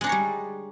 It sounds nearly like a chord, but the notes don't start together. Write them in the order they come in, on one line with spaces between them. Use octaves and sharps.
G#3 D4 D#4 C#5 G3